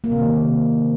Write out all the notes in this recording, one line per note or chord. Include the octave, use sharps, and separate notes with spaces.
A#3
C3
D#3